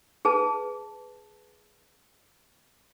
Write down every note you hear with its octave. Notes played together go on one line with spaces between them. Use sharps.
G#4 B4 A5